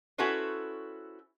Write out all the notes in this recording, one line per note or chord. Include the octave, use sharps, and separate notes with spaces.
C#4 E4 F#4 A4 B4 C5